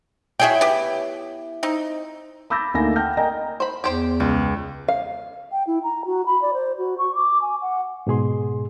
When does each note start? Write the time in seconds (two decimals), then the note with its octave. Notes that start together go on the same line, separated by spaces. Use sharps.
0.40 E4 F#4 G#4 C#5 E5 G5
0.61 B3 G4
1.63 C4 D#4
2.50 B5 D6 E6 G6 A6 A#6
2.74 D2 A3 A#3 D#4 G#5 A#6
2.96 F#5 G5 A5 F6 G6 A#6
3.17 A#4 D#5 G5 G#5 A#5
3.60 C5 B5
3.84 E2 G4 C5 G5
4.20 C#2 G3
4.88 F5
5.52 G5
5.67 E4
5.83 A#5
6.06 F#4
6.26 B5
6.42 D5
6.54 C5
6.78 F#4
6.98 C#6
7.15 D6
7.42 G#5
7.62 F#5
8.07 G#2 B2 G#4 C6